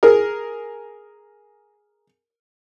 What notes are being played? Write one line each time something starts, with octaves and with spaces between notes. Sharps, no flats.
G#4 A#4